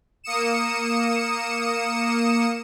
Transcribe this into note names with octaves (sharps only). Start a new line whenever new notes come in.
A#3 D#6 C#7 E7